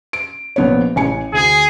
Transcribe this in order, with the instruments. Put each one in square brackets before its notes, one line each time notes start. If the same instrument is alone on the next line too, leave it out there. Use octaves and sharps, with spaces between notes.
[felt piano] D7
A#1 B3 C#5
A1 G#5 C#7
[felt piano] D2 [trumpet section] G#4